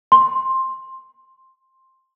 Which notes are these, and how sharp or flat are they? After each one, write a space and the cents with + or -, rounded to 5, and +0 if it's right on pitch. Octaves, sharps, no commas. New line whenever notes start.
C6 +10